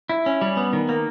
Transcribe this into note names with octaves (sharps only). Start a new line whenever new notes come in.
E4
C#4
G3
B3
D#3
A#3